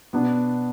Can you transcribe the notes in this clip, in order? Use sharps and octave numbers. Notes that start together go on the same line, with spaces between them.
B2 B3 D4